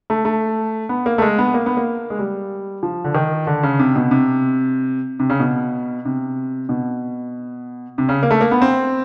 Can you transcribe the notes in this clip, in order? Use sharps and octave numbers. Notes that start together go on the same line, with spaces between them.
A3
A3
B3
A#3
A3
G#3
B3
A#3
B3
A#3
G#3
G3
F3
D3
D#3
D3
C#3
C3
B2
C3
C3
C#3
B2
C3
B2
C3
C#3
A#3
A3
A#3
B3
C4